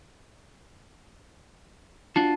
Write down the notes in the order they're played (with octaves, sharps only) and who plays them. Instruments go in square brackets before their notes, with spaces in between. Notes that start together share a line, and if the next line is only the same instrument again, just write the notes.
[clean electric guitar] D4 F4 F#4 [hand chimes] A5